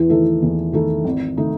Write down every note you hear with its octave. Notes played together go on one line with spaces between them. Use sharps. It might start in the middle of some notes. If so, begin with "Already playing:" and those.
Already playing: E2 E3
D#3 A3 E4 A4
E2
D#3 A3 E4 A4
G#1
D#3 A3 D#4